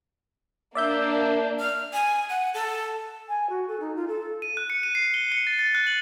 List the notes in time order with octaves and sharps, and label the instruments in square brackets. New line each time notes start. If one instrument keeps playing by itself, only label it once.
[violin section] A#3 D4 [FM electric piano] D5 E5 G6
[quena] F6
G#5
F#5
A4
[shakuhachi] G#5
F#4
A4
D#4
F4
A4
[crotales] D#7
F#6
C#7
D#7
C7
G7
C#7
A6
A6
F#6
F#7